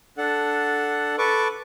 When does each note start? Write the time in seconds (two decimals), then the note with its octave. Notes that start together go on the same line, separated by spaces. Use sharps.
0.18 D4 A4 F#5
1.18 A4 B4 C#6 D6